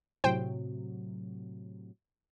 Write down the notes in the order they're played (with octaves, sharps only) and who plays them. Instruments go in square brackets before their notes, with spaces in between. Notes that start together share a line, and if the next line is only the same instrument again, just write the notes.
[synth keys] A2 C3 F#3 [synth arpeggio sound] C5 G5